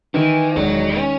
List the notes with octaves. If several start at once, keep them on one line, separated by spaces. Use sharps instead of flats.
D#3 E3
E1 F#3
C#4